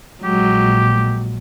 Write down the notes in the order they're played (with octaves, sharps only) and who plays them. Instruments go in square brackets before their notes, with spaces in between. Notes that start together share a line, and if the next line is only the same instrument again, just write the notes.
[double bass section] A#1 A#2 [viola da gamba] F#3 G#3 [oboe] G4